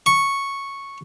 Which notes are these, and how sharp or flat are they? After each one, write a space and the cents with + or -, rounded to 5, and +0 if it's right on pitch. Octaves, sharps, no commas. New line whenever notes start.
C#6 -5